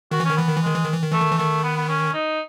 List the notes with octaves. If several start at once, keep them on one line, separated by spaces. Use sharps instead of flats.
D#3 F#4
E3
C#4
D#3
E3 B3
D#3
E3
D#3 G#3
E3
D#3
E3
D#3
E3 A3
D#3
E3
D#3 A3
B3
B3
C#4
D#4